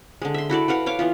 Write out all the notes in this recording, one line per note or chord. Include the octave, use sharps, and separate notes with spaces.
D3 G#3
E5 C6
E4 F#4 A4 D5
F#4 B4 F5 F#5
C#5 F5 D6
E3 B3 F4